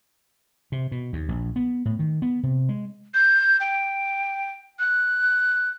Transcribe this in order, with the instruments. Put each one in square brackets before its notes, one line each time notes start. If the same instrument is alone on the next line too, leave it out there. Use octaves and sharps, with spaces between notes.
[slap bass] C3
B2
D#2
A#1
B3
A2
D#3
B3
C3
G#3
[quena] G6
G5
F#6